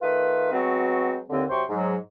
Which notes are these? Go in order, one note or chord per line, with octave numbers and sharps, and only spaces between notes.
D#3 A3 F4 B4
F#3 G#3 B3 C4 F#4
D#2 D3 C4
C3 F#3 C5 G5 C6 C#6
G#2 F#3